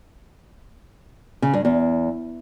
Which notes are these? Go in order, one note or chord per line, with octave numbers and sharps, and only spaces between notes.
C#3
G2
E2